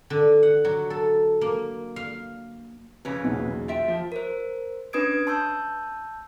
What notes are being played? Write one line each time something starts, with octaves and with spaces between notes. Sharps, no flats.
D3
F#5
F#3
A4
A#3
F5
F2 C#3 C#4 B4
B1 E2 A#2
F4 E5 G5
F3
A#4 C5
C#4 D4 B4 D#6 G#6 D7
A5 C6 E6 G6